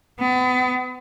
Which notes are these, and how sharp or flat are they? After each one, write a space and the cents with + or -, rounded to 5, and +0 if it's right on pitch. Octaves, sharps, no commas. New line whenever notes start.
B3 +35